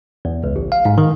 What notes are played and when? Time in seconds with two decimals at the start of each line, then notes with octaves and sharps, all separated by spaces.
0.25 E2
0.44 C#2
0.56 A1
0.72 F5
0.85 G#2
0.98 D#3